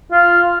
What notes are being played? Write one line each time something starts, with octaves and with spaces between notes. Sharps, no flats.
F4